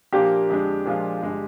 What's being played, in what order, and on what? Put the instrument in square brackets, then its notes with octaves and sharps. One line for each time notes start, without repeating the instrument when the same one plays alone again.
[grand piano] A#2 F3 A#3 D4 F4 [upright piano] G4
[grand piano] F2 D3 G#3 D4
A#2 F3 G#3 D4 F4
G1 D3 G#3